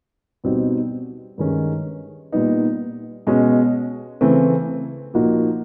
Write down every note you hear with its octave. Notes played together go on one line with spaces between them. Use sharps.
B2 G3 C4 D#4 F#4
G2 D#3 G#3 C#4
A#2 G3 B3 D#4
B2 G#3 C#4
C#3 E3 A3 C4
A#2 F3 A#3 D#4 F#4